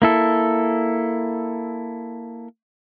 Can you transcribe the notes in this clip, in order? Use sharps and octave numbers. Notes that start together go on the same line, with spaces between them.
A#3 E4 A4